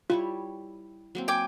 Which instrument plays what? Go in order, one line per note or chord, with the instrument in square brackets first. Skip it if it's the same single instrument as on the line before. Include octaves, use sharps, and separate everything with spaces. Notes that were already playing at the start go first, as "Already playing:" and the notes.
[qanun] G3 E4 C#5 [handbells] F4
[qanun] F#3 A#3 C4
[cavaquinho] G5 G#5 D6